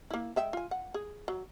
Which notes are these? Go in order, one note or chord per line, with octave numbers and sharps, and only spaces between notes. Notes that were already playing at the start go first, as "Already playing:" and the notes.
A#3 E4
G#3 E5 G5
F4 G#5
F#5
G#4
F#3